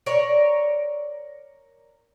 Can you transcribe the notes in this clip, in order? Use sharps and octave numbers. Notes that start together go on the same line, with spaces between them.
A#4 C#5 D5